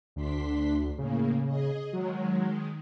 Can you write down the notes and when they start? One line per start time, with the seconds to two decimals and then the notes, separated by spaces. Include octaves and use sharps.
0.16 D2 D4 C6 B6
0.98 A2 C#3 A#3
1.46 G#4 D#5
1.93 D#3 F#3 G#3